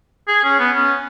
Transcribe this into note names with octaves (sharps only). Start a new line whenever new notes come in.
G#4
C#4
B3
C#4